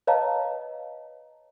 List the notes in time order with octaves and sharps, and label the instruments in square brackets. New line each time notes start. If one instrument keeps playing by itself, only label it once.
[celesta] B4 C#5 D#5 F5 A5 A#5